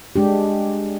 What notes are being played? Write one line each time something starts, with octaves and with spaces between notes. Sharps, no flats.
G#3 D4 G4